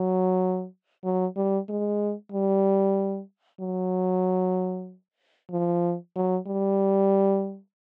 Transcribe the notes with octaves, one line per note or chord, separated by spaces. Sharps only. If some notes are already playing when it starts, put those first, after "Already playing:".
Already playing: F#3
F#3
G3
G#3
G3
F#3
F3
F#3
G3